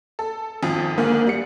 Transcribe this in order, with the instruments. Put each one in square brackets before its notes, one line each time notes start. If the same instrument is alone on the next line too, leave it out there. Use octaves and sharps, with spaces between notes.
[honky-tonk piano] A4
G#1 F2 F3
[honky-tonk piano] D2 G#2 [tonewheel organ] A#3
[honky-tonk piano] G3 C#7